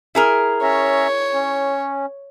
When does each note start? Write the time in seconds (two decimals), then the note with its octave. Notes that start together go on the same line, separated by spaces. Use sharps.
0.15 E4 G#4 A#4
0.63 C#4 C#5 E5 A#5
1.34 C#4